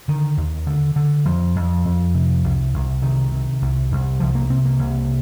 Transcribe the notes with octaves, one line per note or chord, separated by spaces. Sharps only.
D3 D#3
D#2
D3
D3
F2 F3
F2
F2
C3
C2
C2
C3 D#3
C3
C2
C2
C2 F3
A#3
C3 C4
A#3
C2